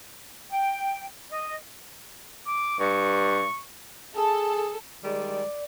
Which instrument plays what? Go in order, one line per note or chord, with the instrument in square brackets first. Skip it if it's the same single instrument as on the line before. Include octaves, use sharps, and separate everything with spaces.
[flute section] G5
D#5
[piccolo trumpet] D6
[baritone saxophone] G2 [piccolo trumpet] C#6
[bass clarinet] G#4 [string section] A4
[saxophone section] D#3 G3 G#3 [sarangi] D5